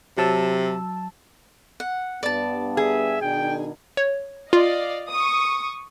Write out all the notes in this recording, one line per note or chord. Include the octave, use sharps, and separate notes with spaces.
C3 F#3 A5 E6
F#5
G2 B3 D5 A5
G#4 E5
B2 D#3 D4 G5
C#5
F4 D5 D#5 F5
C#6 D#6